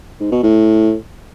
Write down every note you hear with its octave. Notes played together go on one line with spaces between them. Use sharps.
G#2
B2
A2